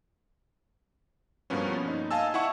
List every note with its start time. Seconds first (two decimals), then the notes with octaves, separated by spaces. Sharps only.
1.50 G2 B2 F3 A#3 B3 C#4
1.88 D#4
2.11 D#5 F5 G#5 A5 E6
2.34 E4 F#5 C#6